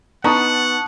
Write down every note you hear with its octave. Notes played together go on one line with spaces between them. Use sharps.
B3 D#4 F#5 A5 C#6 D#6